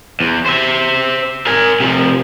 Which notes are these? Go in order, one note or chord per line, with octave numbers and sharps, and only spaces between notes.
E2
C5 E5
A#4 G#5
C3 F3